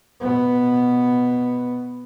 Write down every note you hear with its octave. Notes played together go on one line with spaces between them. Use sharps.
B2 B3